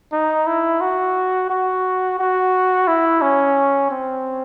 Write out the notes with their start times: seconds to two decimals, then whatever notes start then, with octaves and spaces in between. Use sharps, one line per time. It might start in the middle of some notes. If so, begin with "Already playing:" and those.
0.12 D#4
0.47 E4
0.81 F#4
1.50 F#4
2.19 F#4
2.88 E4
3.22 C#4
3.91 C4